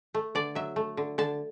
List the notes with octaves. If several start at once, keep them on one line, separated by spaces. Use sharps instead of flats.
A3
D3 D5
F#3 E5
A3
D3
D3 A5